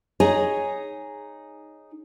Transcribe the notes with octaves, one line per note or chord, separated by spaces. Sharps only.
D#4 G#4 C#5 D#5 G#5